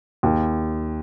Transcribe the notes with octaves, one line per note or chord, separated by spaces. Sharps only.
D#2